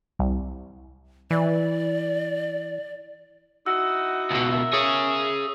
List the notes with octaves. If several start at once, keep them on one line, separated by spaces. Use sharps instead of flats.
C2
E3 D5
D#4 E4 F#4 E6
C#2 B2
A#4 E5
G#4 C#5 D#6